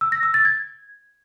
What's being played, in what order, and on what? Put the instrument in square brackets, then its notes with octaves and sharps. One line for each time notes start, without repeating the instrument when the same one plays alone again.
[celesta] E6
A#6
E6
A6
G#6